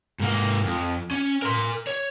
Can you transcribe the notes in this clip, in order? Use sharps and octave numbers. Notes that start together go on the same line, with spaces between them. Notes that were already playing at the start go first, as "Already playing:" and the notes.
G#2 A#3
F2
C#4
A#4 C6
C#5